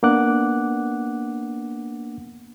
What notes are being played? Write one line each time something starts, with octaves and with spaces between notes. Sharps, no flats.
A#3 B3 D4 F#5 D6 F#6